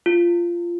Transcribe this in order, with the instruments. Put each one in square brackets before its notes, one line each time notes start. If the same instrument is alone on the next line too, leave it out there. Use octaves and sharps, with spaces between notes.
[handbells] F4